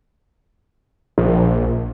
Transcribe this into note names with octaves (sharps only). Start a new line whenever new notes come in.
A#1